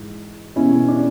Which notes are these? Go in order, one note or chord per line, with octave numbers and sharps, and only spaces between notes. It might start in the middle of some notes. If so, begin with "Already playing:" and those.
Already playing: G#2 E3
E2 B2 C#4 E4
D4